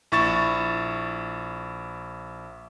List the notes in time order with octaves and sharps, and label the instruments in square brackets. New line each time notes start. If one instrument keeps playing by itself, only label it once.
[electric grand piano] A#1 E4 C#6 A6 E7